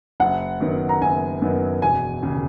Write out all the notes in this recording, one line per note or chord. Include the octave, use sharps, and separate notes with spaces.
F#1 F#5
F#2 D#3 F#3 B3
A#5
F#1 G#5
F#2 D#3 F#3 B3
E1 G#5
D#2 C#3